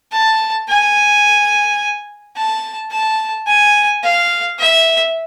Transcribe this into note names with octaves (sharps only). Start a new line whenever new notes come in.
A5
G#5
A5
A5
G#5
F5
E5